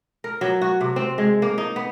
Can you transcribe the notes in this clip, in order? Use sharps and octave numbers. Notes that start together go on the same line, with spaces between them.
A#4
F#3
F#4
C3
C4
G#3
A#3
D#4
B3